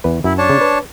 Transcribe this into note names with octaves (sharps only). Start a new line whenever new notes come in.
E2 B4
F#2 E4
D4 C#5 A5
C#3
B4